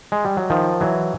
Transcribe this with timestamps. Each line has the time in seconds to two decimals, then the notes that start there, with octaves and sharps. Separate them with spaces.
0.12 G#3
0.25 G3
0.37 F#3
0.50 D#3 F3
0.81 E3 F#3